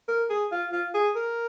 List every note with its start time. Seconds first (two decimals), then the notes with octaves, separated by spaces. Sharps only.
0.08 A#4
0.30 G#4
0.52 F4
0.72 F4
0.94 G#4
1.16 A#4